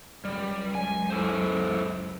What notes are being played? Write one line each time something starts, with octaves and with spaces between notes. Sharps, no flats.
C#2 F#2 G3
G#5
E4 A4 C5